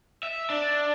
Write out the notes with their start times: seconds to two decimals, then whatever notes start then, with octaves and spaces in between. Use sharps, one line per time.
0.23 E5
0.50 D4